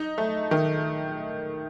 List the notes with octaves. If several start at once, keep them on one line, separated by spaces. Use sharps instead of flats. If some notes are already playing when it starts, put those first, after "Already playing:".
Already playing: D#4
A3
D#3